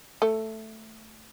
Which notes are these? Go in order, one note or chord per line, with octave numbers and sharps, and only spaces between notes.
A3